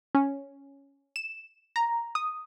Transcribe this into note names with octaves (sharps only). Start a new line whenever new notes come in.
C#4
E7
A#5
D#6